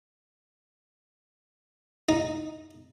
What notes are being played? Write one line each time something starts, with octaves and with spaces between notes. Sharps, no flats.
D#4